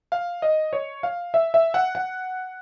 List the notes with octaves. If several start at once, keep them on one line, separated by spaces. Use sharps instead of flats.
F5
D#5
C#5
F5
E5
E5
F#5
F#5